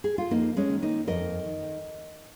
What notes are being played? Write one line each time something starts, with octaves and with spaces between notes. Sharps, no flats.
G#4
F4
F2 A#3 D#4
G#3 C#4
D#3
A#3 D#4
F2 A#4 D#5
D#3